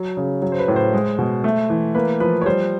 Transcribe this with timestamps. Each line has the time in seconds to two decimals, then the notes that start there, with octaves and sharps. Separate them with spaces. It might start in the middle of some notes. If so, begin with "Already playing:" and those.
Already playing: F#3
0.17 C#3
0.42 F#3
0.52 C5
0.59 B4
0.68 A2
0.76 C5
0.93 G#3
1.19 B2
1.44 A3
1.70 E3
1.95 A#3 B4
2.20 F3 B4
2.42 C#5
2.46 G3 C5